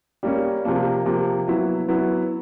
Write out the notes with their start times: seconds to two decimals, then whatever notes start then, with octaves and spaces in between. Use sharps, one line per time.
0.23 G3 A#3 C#4
0.65 C3 F3 A#3
1.05 C3 F3 A#3
1.48 F#3 B3 E4
1.88 F#3 B3 E4